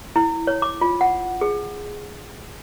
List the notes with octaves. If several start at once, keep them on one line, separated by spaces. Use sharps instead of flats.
E4
C#5
D6
F4
F#5
G#4